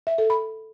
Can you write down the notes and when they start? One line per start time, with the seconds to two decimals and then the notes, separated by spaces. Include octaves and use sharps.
0.07 E5
0.18 A4
0.30 B5